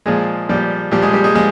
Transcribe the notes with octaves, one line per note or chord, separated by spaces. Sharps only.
A#2 F3 G#3 G#4
A#2 F3 G3 G4
A#2 F3 G3 G4
G#3 G#4
G3 G4
G#3 G#4
F3 G#3 G#4